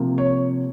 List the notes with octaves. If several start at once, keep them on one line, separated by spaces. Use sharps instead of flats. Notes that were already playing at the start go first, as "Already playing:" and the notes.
Already playing: C3 F3 A#3
C#5